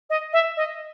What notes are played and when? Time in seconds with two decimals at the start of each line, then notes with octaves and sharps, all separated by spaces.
0.09 D#5
0.33 E5
0.57 D#5